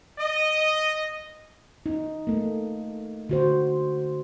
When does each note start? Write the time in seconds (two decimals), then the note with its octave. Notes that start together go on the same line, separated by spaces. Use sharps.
0.19 D#5
1.86 D#4
2.27 A3 A#3
3.29 D3 F#4 C5